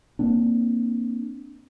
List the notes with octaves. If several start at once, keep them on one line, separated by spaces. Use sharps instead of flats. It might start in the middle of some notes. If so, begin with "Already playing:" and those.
A#3 C4 D4